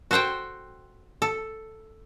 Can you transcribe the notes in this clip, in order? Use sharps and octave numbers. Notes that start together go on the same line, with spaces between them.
F#4 A4 C5 F#5 G5
A4